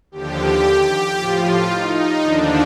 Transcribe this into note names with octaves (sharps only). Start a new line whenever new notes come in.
D#2 D3 F3 G4
A2 F3 F4
D#4
D#2 D3 F3 D4